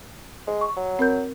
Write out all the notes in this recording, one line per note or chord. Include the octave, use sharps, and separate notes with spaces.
G#3
C#6
F#3
C4 A#4 G6